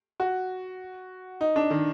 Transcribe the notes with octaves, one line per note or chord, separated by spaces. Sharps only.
F#4
D#4
D4
D#3